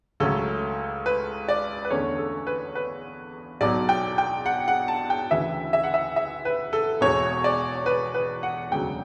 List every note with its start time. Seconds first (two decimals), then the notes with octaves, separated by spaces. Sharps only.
0.20 C#2 C#3 F#3 A3 C#4 A4
1.06 B4
1.48 D5
1.85 B4
1.90 E2 D3 A3 C#4 C#5
2.18 A4
2.47 B4
2.75 B4
3.61 B1 B2 F#3 D5
3.89 G5
4.18 G5
4.46 F#5
4.68 F#5
4.88 A5
5.10 G5
5.31 D2 C#3 E3 E5
5.73 E5
5.83 F#5
5.94 E5
6.16 E5
6.45 B4
6.73 A4
7.01 E1 E2 B2 C#5
7.44 D5
7.86 B4
8.14 B4
8.43 F#5
8.71 E1 D2 C#3 F#3 G5